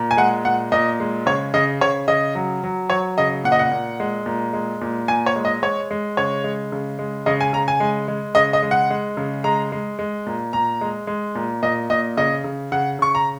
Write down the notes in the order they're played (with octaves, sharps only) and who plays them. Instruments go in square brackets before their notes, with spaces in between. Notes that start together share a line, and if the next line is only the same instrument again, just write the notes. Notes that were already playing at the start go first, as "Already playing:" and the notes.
Already playing: [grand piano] A#2
G#5
G#3 F#5
A#2 F#5
A#2 D#5
G#3
C#3 C#5
C#3 D#5
C#3 C#5
C#3 D#5
F#3
F#3
F#3 C#5
C#3 D#5
A#2 F#5
D#5
F#5
A#2
G#3
A#2
G#3
A#2
A#2 G#5
C#5
G#3
D#5
G#3 C#5
G#3
C#3 C#5
G#3
C#3
G#3
C#3 D#5
G#5
C#3 A#5
G#5
G#3
G#3
C#3 D#5
D#5
G#3
F#5
G#3
C#3
G#3 A#5
G#3
G#3
A#2
A#2 A#5
G#3
G#3
A#2
A#2 D#5
A#2 D#5
C#3 D#5
C#3
C#3 F#5
C#3 C#6
A#5